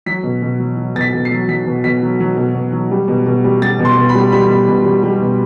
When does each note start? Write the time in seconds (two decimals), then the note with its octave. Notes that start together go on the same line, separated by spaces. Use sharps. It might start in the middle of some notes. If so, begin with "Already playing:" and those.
0.06 F#3 B6
0.23 B2
0.42 B2
0.60 F#3
0.77 F#3
0.95 B2 A6
1.01 B6
1.13 B2
1.25 C7
1.31 F#3
1.48 F#3 B6
1.66 B2
1.84 B2 B6
2.02 F#3
2.20 F#3
2.37 B2
2.55 B2
2.72 F#3
2.91 G3
3.08 B2
3.26 B2
3.44 G3
3.62 G3 A6
3.79 B2
3.85 C6
3.97 B2
4.09 B5
4.15 G3
4.32 G3 B5
4.50 B2
4.68 B2
4.85 G3
5.03 G3
5.22 B2